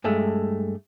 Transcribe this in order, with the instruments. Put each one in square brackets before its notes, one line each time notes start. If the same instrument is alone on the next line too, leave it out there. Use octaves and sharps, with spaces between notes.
[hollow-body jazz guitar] G2 G#3 A3